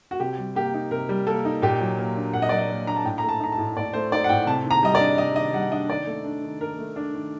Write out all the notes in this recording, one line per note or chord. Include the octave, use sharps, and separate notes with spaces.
F#4
C3 G4
G3
A#3 G4
D#4
C3 A#4
G3
A#3 A4
D#4
A#2 G4
F#3
A#3
D4
A#2 F#5
D#5
F#3 D5
D#5
A#3
D4 A#5
A5
A2 G5
A3 A#5
A5
D#4 A#5
A5
A2
A2 D5
A3 C5
D#4 D5
F#5
A2 G5
C3 A5
D#3
A#5
G3 D#5
D5
D4
C3 D#5
D#3 D#5
G3 F#5
D4 D#5
D#3 D5
A3
D4
D#3
D#3 A#4
A3
D4
D#3